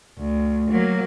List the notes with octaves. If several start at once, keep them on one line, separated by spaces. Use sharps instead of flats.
D2
F#3 A#3